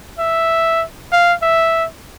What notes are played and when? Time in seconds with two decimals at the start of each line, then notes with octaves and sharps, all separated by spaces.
0.19 E5
1.12 F5
1.42 E5